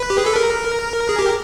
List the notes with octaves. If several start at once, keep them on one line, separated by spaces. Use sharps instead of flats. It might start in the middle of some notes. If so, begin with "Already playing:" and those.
Already playing: B4
G4
G#4
A4
A#4
G#4
G4